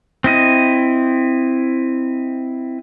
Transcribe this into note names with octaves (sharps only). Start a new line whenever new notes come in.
C4 E4 D#5